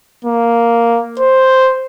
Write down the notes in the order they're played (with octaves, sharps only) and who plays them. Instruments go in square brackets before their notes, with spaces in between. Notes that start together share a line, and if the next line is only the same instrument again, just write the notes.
[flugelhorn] A#3
C5